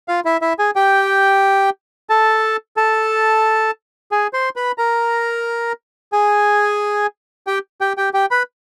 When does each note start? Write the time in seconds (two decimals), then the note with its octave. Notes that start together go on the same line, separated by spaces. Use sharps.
0.08 F4 F5
0.25 E4 E5
0.42 E4 E5
0.59 G#4 G#5
0.76 G4 G5
2.09 A4 A5
2.77 A4 A5
4.11 G#4 G#5
4.33 C5 C6
4.56 B4 B5
4.78 A#4 A#5
6.12 G#4 G#5
7.47 G4 G5
7.81 G4 G5
7.97 G4 G5
8.14 G4 G5
8.31 B4 B5